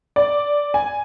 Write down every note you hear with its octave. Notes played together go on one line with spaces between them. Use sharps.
D5
G#5